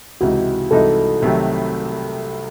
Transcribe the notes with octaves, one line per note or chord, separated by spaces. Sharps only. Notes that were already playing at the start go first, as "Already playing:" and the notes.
C#2 C3 E3 G#3 D#4 F#4
C2 C3 E3 G#3 D#4 A4
C2 C3 D#3 F#3 A3